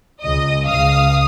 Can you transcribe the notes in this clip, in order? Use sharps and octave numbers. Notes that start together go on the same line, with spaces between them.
C#2 D#5
C#2 F5 D#6